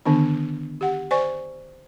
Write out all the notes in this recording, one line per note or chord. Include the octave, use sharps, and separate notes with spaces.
D3 D#3 B3 D4
G4 F#5
C5 D5 G#5 C#6